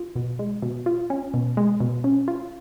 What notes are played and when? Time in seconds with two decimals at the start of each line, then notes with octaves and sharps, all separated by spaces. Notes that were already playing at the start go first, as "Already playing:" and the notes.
Already playing: F4
0.16 B2
0.39 G#3
0.62 B2
0.86 F4
1.10 C#4
1.34 B2
1.57 G#3
1.80 B2
2.04 C#4
2.28 F4